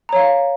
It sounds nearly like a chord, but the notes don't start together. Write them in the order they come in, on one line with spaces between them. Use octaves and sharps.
A#5 C#5 F5